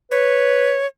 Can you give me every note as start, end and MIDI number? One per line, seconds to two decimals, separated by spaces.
0.11 0.76 71
0.11 0.86 73